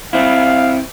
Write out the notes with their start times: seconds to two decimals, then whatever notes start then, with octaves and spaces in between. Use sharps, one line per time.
0.13 C4 E4 F5